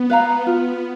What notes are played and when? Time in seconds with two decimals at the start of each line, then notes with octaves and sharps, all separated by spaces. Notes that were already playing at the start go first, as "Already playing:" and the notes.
Already playing: B3
0.10 B4 F5 A#5
0.46 B3 F4